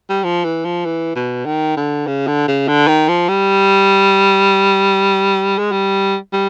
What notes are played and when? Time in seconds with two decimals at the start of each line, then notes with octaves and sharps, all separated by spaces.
0.09 G3
0.24 F3
0.44 E3
0.65 F3
0.85 E3
1.16 B2
1.46 D#3
1.77 D3
2.07 C#3
2.27 D3
2.48 C#3
2.68 D3
2.88 D#3
3.08 F3
3.29 G3
5.59 G#3
5.72 G3
6.33 G3